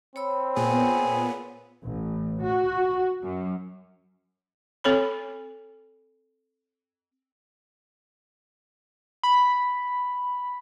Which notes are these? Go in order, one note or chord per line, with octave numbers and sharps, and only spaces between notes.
C4 C#5 B5 E6
A#2 B3 G#4
A1
F#4
F#2
C4 A4 C#5 B5
B5